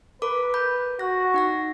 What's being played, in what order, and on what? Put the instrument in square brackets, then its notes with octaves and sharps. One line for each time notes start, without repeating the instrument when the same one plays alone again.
[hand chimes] A#4 D6 [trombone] B4
[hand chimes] B5 G6
[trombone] F#4 [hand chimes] F#6 A#6
[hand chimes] D#4 F#5 A#6